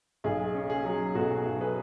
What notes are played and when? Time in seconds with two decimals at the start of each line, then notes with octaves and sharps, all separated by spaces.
0.24 B1 G#4
0.54 C#4
0.70 G#4
0.85 F#3
1.15 B2 F#4 A4
1.46 B1
1.60 G#4 B4